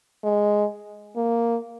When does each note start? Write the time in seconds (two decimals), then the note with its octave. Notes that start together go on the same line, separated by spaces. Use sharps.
0.24 G#3
1.16 A#3